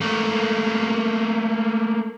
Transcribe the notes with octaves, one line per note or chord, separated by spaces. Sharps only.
A3 A#3